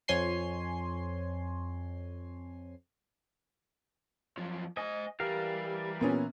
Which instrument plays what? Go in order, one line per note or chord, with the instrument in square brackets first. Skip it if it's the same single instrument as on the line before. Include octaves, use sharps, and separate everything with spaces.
[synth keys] F2 C#5 G#5 C6 C7
[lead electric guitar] F#2 F3
[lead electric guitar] C5 G#5 [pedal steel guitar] D#5
[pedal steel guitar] E3 A#4 F5 [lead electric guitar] G3 G4
[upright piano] A#2 B3 C#4